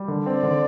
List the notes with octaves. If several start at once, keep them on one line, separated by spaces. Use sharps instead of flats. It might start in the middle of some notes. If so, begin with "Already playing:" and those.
Already playing: G3
D3
C4 D5
D3